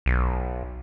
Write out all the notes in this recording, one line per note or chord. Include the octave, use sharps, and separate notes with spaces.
B1